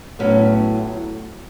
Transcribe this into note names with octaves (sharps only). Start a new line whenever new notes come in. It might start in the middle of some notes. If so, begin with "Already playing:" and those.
A2 F#3 B3 C#4